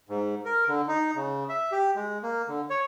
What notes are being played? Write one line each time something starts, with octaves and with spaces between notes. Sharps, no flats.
G#2
A#4
D3
D#4
C#3
E5
G4
G#3
A#3
D3
C#5